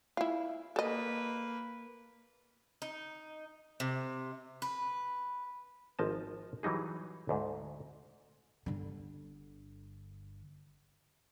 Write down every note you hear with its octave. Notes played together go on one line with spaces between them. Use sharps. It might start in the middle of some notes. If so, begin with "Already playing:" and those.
E4 F4
A#3 A4 B4 D#5
D#4
C3
B4
G#1 F3 D#5 A5
E3 F#3 G3 D#4 G#4
D2 G#2
G1 D3